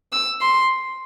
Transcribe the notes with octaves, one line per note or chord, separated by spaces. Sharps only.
E6
C6